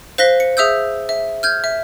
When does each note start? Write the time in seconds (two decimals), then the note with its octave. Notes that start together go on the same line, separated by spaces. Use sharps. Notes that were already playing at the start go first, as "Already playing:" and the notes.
0.18 C5 F5 F#6 A#6 B6 G7
0.40 C#7
0.57 G#4 E5 D#6 E6 G6
1.09 E5
1.43 F6 G6 G#6
1.64 E5